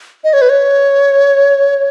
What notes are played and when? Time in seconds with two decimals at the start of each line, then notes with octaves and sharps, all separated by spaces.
0.24 D#5
0.33 C#5
0.42 B4
0.49 C#5